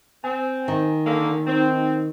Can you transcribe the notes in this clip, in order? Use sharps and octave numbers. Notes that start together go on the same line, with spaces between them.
C4 G#5
D#3
D3 A#3
C4 D#4